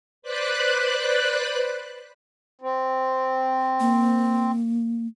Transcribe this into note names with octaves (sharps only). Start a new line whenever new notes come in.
B4 C5 D5 B5 F#6
C4
A#3